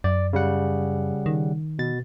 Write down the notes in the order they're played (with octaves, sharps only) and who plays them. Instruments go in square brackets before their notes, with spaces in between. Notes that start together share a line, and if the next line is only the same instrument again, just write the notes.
[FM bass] F#2 [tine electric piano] D5
[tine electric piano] C#3 G3 F#5
[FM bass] D#3
[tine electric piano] B2 A6